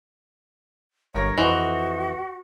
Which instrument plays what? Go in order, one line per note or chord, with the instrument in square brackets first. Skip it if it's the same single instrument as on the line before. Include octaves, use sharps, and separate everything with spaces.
[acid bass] G1 [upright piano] G2 A#4 A#6 [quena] C#5
[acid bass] F2 [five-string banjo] E3 [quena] F#4 [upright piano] C5 D#5 C#6